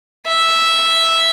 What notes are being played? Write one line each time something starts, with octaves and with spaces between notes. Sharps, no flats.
E5